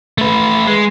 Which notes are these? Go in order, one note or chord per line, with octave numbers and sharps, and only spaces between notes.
A3 B4
G#3